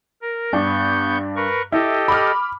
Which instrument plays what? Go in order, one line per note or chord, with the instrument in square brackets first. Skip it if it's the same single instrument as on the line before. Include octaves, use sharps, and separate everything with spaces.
[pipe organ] A#4
[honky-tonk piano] G2 D4 [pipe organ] B3 C#6 G6
[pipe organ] A#4 B4 C#6
[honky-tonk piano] E4 [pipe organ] G4 A4 D#5
[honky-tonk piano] B5 D6 F6